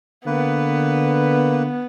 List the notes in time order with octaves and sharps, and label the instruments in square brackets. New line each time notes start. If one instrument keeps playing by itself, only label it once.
[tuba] D3 [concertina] A#3 B4 [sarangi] B3